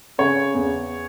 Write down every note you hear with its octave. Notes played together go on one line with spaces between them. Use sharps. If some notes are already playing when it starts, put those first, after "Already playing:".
C#3 C#5
E2